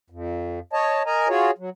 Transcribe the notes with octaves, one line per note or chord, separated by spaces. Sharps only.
F2
C#5 D#5 A5
A#4 D#5 G#5 A#5
F4 F#4 G#4 C#5
F#3